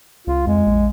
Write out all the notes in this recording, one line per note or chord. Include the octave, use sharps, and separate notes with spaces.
C#2 F4
F2 G#3
A#1